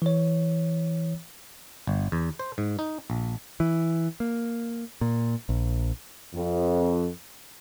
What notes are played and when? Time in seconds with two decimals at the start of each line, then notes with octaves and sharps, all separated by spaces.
0.02 E3 C#5
1.87 G1
2.12 E2
2.39 C5
2.58 G#2
2.79 D#4
3.10 A#1
3.60 E3
4.20 A#3
5.01 A#2
5.49 A#1
6.35 F2